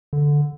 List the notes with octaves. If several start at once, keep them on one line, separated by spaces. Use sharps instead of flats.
D3